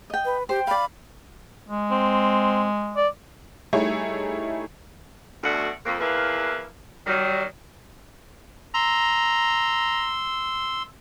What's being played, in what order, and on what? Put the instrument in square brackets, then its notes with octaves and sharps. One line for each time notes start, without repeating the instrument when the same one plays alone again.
[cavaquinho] D#5 G5
[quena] B4
[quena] G4 [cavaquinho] C5 [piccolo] G5
[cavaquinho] D5 F5 [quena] B5
[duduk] G#3
[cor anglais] C4
D5
[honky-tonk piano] G3 A3 D#4 E4 G#4 C#5
[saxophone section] D2 B2 A3 F#4 D5 F#5
F2 A#3
E2 F3 A#3 E4 B4 F5
D#3 F#3 G3
[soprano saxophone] A#5 [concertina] C6 E6